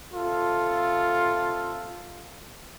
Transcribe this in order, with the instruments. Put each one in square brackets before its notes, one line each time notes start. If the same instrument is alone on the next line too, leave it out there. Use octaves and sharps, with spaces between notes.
[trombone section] C3 A4 [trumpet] F4